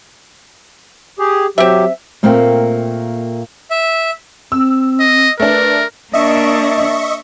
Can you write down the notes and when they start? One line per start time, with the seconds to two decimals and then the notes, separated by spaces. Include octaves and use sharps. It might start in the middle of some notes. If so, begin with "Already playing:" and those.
1.19 G4 G#4
1.58 F#3 C4 G4 E5
2.23 A#2 A3 A#3 C4 A#4 G5
3.71 E5
4.52 C4 E6
5.00 D#5
5.40 A3 D4 A#4 B4
6.13 A#3 D4 D#5 E5 C#6